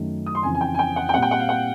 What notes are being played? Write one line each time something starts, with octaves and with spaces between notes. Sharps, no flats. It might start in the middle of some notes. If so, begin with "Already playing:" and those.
Already playing: F#2 D#3 F#3 A3
D#6
C6
F2 C#3 E3 G#5
G#5
G5
G#5
G5
F#5
G5
A#2 G3 C4 F#5
G5
F#5
F5
F#5